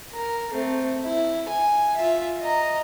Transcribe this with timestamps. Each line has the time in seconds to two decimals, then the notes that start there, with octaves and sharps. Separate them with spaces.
0.13 A#4
0.50 A3 C4
1.04 E4
1.49 G#5
1.97 F4 E5
2.41 D#5 A#5